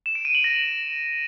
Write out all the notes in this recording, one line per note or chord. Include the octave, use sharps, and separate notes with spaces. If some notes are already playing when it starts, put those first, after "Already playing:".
E7
D7
D#7
F#7
A#6